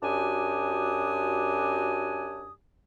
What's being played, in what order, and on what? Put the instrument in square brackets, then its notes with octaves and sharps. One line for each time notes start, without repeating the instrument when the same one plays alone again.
[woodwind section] F#2 D4 F#4 G4 G#5 D#6